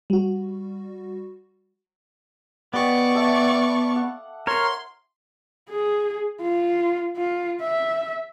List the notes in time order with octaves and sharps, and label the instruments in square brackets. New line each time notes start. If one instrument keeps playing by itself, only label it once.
[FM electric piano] G3 F#4
[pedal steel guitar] B3 [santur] G4 D#5 D6 [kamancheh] D5 C#6
[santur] A4 E5
F5 D6
F#5
[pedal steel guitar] A#4 C#5 [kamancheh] C6
[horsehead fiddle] G#4
F4
F4
E5